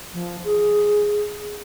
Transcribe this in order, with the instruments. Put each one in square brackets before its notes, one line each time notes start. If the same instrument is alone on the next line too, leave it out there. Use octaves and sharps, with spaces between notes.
[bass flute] F3
G#4